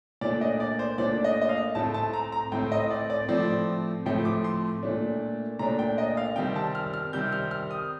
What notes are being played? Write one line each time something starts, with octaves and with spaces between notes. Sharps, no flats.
A#2 A3 D4 D5
D#5
D5
C5
A#2 A3 D4 D5
D#5
D#5
F5
A2 A3 C4 A5
A5
A#5
A#5
A2 A3 C4 G5
D#5
D5
D5
A2 F3 A3 C4 D5
A2 F3 A3 C4 G5
D6
C6
A#2 A3 D4
A#2 A3 D4 A#5
G5
D#5
F5
C3 D#3 G3 C4 G5
A5
F6
F6
C3 D#3 G3 C4 G6
F6
F6
D#6